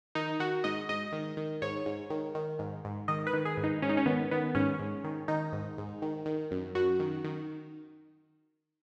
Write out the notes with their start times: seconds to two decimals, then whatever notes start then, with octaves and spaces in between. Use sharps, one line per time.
0.15 D#3 D#4
0.40 D#3 F#4
0.64 G#2 D#5
0.89 G#2 D#5
1.12 D#3
1.37 D#3
1.62 G#2 C#5
1.86 G#2
2.10 D#3
2.35 D#3
2.59 G#2
2.85 G#2
3.08 D#3 D#5
3.27 B4
3.33 D#3
3.45 G#4
3.57 G#2
3.64 D#4
3.82 G#2 C#4
3.89 D#4
3.97 C#4
4.06 D#3 B3
4.31 D#3 B3
4.55 G#2 C#4
4.79 G#2
5.04 D#3
5.28 D#3 D#4
5.52 G#2
5.78 G#2
6.02 D#3
6.26 D#3
6.51 F#2
6.75 F#2 F#4
7.00 D#3
7.24 D#3